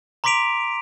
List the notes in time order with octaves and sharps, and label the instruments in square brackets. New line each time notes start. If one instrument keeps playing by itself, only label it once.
[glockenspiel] A#5 C6 D6 B6 D7 F7